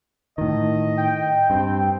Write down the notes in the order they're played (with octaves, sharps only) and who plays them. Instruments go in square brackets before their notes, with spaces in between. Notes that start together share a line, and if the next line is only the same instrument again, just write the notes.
[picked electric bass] A2 D#3 [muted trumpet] D#5
[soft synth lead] G5
[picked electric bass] G2 [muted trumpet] C4